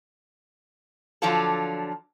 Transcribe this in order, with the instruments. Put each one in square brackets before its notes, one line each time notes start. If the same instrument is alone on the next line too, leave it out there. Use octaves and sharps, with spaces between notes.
[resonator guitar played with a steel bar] D3 F3 F#3 D4 F4 A4